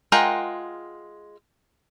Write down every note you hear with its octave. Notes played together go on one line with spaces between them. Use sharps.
G#3 F4 A#4 F#5 G5